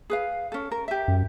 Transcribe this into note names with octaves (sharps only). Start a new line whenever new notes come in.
G#4 B4 F5
C#4 A4
A#4
G4 E5
F#2